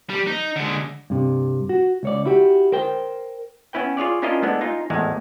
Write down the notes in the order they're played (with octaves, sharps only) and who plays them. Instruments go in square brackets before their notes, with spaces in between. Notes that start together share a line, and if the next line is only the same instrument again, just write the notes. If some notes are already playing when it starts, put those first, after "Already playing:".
[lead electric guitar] G3
D#4
D3 G#3
[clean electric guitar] G2 C3
F#4
C#2 C#5 D5
E4 F#4 G4
A#4 C5 G5
[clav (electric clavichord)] B3 C#4 E4 B4 G5
F4 G#4 C#5 D5
C#4 D4 E4 F4 A#4 D#5
G#3 A3 B3 D4 E4
D#4 F4 G#5
G#1 E2 A2 G#3 A#5